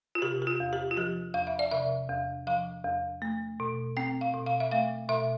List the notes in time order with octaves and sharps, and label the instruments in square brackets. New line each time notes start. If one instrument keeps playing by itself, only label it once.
[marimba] F4
C3 G4
G4
F4
E2
G4
F4
F3 G4
E2 F5
E5
D5
C3 E5
E2
F3 F5
E2
A3
B2
C4 G5
F5
B2
F5
E5
A3 F5
B2 E5